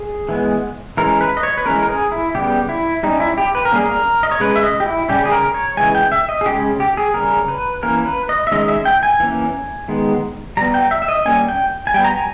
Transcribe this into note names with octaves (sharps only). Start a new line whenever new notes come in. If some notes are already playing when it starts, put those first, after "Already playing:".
Already playing: G#4
E3 G#3 B3
E3 G#3 C#4 A#4
B4
D#5
C#5
B4
E3 G#3 C#4 A#4
A#4
G#4
E4
C#3 G3 B3 G4
E4
G3 C#4 D#4
E4
G4
B4
A#4
G3 A#3 C#4 G#4
A#4
D#5
C#5
C#3 G#3 C#4 B4
E5
D#5
G4
E4
C#3 G3 C#4 G4
G#4
A#4
C#5
C#3 E3 G#3 G#5
G5
E5
D#5
G#4
C#3 G#3 C#4 G4
G4
G#4
C#3 G3 C#4 A#4
B4
E3 A#3 C#4 A#4
B4
D#5
E5
D#3 G#3 C#4 D#5
E5
G5
G#5
E3 A#3 C#4
D#3 G#3 B3
G3 B3 A#5
G5
E5
E5
D#5
G3 A#3 C#4 G#5
G5
G#5
G3 B3 G5
A#5
G#5